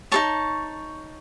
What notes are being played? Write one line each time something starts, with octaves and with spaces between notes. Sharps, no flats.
D#4 A4 C#5 A5 C#6